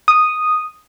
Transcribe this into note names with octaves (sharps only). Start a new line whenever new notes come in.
D#6